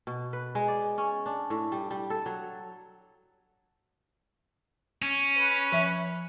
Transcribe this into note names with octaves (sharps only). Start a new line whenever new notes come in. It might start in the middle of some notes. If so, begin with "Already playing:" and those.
B2
B4
G#3
D5
C#4
D4
A2
G3
G3
A4
F#3
C#4
B4
F3 E5